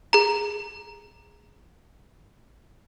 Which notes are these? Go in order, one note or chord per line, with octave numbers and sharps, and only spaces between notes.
G#4 A#5